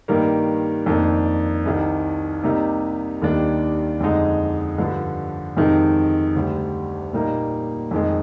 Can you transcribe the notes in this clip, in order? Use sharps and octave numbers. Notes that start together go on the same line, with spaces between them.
G2 D#3 G3 A#3
F2 D#3 A#3 D4
C2 C3 D#3
C3 G3 A#3 D#4
D#2 D#3 G3 D4
F2 D3 G#3 D#4
G2 D3 F3
F2 C3 D#3 G#3 D#4
D2 D3 G3
A#2 G3 A#3 D#4
F2 D#3 G#3